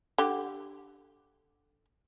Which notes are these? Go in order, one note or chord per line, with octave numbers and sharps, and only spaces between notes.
D3 G4